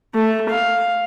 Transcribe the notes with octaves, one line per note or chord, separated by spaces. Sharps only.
A3
F5